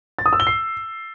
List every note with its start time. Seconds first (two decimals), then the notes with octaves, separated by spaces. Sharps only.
0.19 A6
0.26 D#6
0.33 E6
0.40 G7
0.47 C7